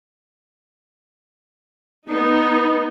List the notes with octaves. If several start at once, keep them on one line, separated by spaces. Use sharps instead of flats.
B3 D#4